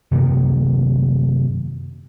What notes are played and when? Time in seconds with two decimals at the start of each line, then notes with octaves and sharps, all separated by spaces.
0.11 F#2 C3 D#3 A#3